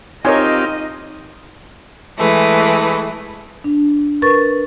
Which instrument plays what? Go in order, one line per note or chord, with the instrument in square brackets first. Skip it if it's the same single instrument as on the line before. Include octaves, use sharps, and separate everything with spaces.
[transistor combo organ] C4 F4 G4 [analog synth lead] D#4 [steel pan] A#4 C#5 G#5 [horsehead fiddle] D#5
[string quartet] E3 G#3 A3 B4
[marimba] D4
A#4 B4 C#6 A6